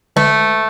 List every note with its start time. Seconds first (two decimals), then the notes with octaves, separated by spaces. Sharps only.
0.16 D3 A3